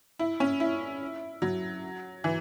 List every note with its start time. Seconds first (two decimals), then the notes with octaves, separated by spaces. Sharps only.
0.19 E4
0.40 C#4
0.60 E4
1.42 F#3
2.24 E3